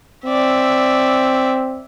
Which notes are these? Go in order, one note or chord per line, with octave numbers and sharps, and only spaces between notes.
C4 D5 E5